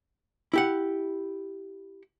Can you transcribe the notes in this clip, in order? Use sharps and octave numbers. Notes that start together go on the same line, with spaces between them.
E4 G4 F#5